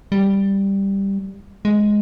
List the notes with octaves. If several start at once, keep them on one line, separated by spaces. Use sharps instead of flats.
G3
G#3